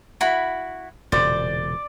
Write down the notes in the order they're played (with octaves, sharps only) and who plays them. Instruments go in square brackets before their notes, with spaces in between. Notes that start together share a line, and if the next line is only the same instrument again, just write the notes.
[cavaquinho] E4 F#4 B5
[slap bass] E1 A#2 C#3 [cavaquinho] C5 [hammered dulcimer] D5